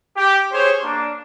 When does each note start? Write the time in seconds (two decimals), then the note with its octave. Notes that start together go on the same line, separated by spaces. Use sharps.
0.16 G4
0.51 C#4 G4 G#4 C5 C#5
0.83 A#3 D4